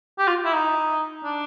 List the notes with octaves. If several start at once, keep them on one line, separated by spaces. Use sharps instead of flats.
G4
F4
E4
D#4
D4